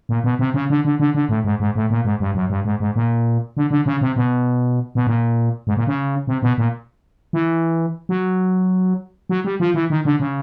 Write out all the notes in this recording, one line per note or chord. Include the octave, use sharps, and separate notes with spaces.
A#2
B2
C3
C#3
D3
D3
D3
D3
A2
G#2
G#2
A2
A#2
G#2
G2
F#2
G2
G#2
G#2
A#2
D3
D3
C#3
C3
B2
B2
A#2
G#2
A#2
C#3
C3
B2
A#2
E3
F#3
F#3
G3
F3
E3
D#3
D3
C#3